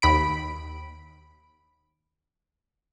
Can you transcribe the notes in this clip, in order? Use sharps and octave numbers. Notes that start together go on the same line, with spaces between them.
D#2 B5 D7